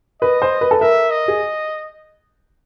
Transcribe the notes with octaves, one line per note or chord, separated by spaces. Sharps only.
B4 D#5
C5
B4
A4
A#4 E5
D#5
G#4